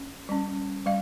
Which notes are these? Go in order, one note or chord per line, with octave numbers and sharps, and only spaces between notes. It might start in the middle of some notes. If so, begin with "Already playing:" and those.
Already playing: C#4
G3 C#4
G3 F5